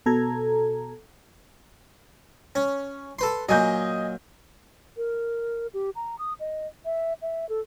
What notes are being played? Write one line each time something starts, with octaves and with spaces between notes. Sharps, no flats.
B2 A4 A#5 G#6
C#4
A4 B4 C6
A#2 F#3 D#5 G#5 G6
A#4
G4
A#5
D#6
D#5
E5
E5
A4